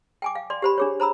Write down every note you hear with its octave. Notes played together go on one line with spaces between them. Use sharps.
G5 G#5 D6
F5
D5 C6
G4 C5 B5
D4 G#4 C#5
C5 A#5 B5 E6